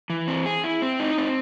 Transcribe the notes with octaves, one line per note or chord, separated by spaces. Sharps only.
E3
C4
G#4
E4
C4
D#4
C4